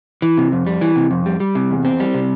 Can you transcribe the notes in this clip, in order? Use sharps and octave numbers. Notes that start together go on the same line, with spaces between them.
E3
C3
F2
G3
E3
C3
F2
G3
G3
C3
E2
C4
G3
C3